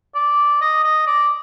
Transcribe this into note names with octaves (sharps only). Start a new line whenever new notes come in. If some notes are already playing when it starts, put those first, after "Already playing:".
D5
D#5
D#5
D5